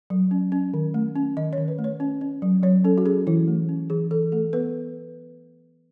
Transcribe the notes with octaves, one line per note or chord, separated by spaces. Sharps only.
F#3
C#4
C#4
D#3
A3
C#4
D#3 D#5
C#5
D#3
B4
A3
C#5
C#4
C#4
F#3
F#3 C#5
C#4 A4
F#4
C#4 G#4
E3 E4
A3
C#4
E3 G#4
E3 A4
A3 A4
B3 B4